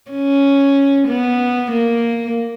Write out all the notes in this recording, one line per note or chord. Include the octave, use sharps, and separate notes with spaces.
C#4
B3
A#3